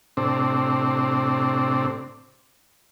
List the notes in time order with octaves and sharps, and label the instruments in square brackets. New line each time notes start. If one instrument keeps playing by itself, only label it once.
[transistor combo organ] A2 C3 C4 D4